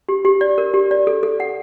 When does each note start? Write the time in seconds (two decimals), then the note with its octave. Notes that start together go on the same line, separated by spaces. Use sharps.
0.09 G4
0.25 G4
0.41 D5
0.58 A#4
0.74 G4
0.91 D5
1.07 A4
1.23 A4
1.40 F#5